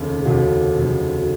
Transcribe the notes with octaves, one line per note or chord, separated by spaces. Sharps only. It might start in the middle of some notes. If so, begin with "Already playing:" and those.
Already playing: F1 D#2 C#3 F3 C#4
G#4
F1 D#2 C#3 F3 F#4
F1 D#2 C#3 F3
F#4